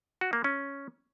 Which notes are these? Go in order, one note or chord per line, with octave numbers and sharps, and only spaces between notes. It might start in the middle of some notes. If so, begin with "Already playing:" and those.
F#4
A#3
C#4